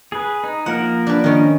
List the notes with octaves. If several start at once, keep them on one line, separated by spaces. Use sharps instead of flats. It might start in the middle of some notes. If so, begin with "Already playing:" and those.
G#4 B4
D#4
F3 A#3 A#4 F#5
D4 B4
D#3 C#4